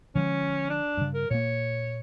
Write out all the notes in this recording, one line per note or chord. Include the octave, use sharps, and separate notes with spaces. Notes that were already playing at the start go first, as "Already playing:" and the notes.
D3 F3 G#3 C#4
D4
G2 C#3
A#4
A#2 A#3 C#5